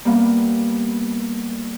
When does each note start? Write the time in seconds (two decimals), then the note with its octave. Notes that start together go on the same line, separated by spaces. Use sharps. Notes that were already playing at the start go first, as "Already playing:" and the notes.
0.05 G3 A#3 B3